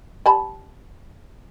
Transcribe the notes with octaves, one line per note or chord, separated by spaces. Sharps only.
G3 A5 B5